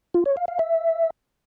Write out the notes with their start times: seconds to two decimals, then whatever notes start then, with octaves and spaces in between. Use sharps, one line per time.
0.14 F4
0.26 C#5
0.37 F5
0.48 F5
0.59 E5